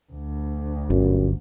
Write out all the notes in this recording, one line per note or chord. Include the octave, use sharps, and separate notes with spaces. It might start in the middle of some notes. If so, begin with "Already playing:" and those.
D2
G1 F#2